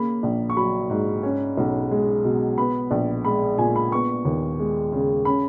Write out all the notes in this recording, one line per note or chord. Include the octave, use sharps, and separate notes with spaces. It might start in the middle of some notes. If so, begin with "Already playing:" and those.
Already playing: C#3 A#3 B5
A#1
C#6
F#3 B5
G#2
C#4
B1
G#3
B2
B3 B5
A#1
G#3 B5
A#2 G#5
B5
B3 C#6
D#2
G#3
C#3
C#4 B5